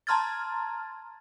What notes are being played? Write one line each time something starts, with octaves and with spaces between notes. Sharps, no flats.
A5 A#5 C6 F6 G#6 A6